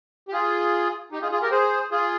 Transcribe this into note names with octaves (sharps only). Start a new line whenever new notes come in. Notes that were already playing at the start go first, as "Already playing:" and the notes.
G4
F4 G#4
D#4 G4
F4 G#4
F4 G#4
G4 A#4
G#4 C5
F4 G#4